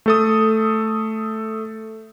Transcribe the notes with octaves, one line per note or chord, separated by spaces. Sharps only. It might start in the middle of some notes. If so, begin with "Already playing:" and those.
A3 A4 D#6